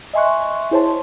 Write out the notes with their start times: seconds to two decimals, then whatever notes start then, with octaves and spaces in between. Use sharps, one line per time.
0.13 D#5 E5 G#5 C6 C#6 F#6
0.71 E4 G#4 C5 C#5 A5 C6